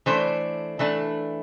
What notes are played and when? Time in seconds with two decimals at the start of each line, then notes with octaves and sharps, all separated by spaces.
0.06 E3 A3 D4 C5
0.79 E3 A3 D4